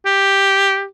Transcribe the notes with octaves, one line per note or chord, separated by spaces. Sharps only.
G4